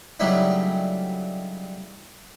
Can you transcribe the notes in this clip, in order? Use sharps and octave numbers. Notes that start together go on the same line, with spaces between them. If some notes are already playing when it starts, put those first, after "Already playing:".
C#3 F#3 G3 A3 D#4 E4